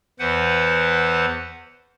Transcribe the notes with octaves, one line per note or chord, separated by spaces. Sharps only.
E2 E3 B4 C5 F#5